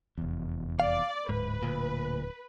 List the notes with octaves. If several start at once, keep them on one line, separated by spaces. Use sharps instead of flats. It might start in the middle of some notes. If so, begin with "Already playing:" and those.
F1 E2
D5 F5
D1 G#2 B4
D2 A#2